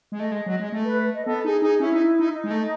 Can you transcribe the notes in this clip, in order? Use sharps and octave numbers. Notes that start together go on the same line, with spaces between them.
G#3
A3 D#5
G#3
F#3
G#3
A3
B4
D#5
B3 A4
D#4 G#4
D#4 G#4
C#4 E4
D#4
D#4
D#4
G#3
A3